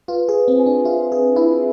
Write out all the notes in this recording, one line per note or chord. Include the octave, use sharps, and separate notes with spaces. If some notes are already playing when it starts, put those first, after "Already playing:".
F4 B4
G#4
B4
C4
G#5
D4
F4 E5
G#4 B4
E4 B4